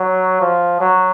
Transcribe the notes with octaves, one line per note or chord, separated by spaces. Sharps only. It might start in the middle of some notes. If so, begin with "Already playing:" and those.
Already playing: F#3
F3
F#3